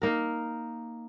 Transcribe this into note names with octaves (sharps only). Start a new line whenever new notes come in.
A#3 D#4 A#4